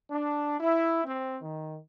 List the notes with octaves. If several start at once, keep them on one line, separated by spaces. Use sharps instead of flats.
D4
E4
C4
D#3